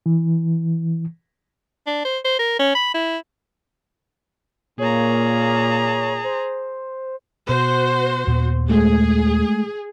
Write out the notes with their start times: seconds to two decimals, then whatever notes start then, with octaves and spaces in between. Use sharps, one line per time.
0.06 E3
1.87 D4
2.05 C5
2.25 C5
2.39 A#4
2.59 C#4
2.75 B5
2.94 E4
4.79 A#2 A#3 G#4 C#5 A#5
6.24 C5
7.49 B2 F#4 C5
8.27 D#2 A#2 B3
8.70 G#3 A3 G#4